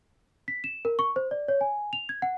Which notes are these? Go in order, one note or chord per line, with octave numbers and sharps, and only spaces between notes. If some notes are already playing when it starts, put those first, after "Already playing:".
B6
E7
A#4
C#6
C5
D5
C#5
G#5
F7
G#6
F#5